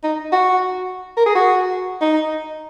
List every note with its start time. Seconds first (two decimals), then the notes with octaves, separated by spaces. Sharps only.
0.03 D#4
0.32 F#4
1.17 A#4
1.26 G#4
1.35 F#4
2.01 D#4